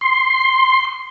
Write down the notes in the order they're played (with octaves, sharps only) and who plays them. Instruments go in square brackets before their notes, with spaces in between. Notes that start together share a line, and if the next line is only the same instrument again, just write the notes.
[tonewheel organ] C6